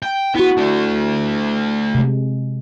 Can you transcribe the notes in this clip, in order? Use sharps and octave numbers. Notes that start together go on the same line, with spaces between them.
G5
B3 E4 F#4
A3 D4
C3 G#3